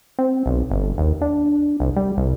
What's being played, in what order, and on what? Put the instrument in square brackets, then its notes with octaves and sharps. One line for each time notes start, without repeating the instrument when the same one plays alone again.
[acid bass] C4
B1
G1
D#2
D4
C2
G3
C2